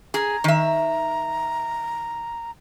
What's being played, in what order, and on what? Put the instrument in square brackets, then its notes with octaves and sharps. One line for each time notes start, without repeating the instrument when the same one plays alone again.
[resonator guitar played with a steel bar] G#4 [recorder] A#5
[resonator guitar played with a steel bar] D#3 E5